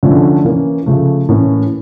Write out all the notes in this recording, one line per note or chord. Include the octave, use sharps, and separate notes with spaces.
D3 F3 A3 C#4
E3 A#3 C#4
C#3 F3 A3
A2 E3 A#3 C#4